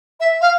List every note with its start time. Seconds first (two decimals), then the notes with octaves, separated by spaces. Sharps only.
0.20 E5
0.41 F5